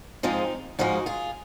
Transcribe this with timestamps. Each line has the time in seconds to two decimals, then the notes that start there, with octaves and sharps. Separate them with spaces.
0.23 G#2 F3 G#3 C4 D#4
0.79 G#2 F3 G#3 D#4 F#4
1.06 F4 G#4